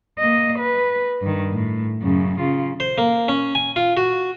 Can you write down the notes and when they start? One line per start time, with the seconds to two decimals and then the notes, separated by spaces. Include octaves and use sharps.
0.19 A#3 D#5
0.59 B4
1.22 G2 D#3
1.52 A2
2.02 F#2 C#3
2.39 C#3 F4
2.80 C5
2.98 A#3
3.28 C#4
3.55 G#5
3.76 F4
3.97 F#4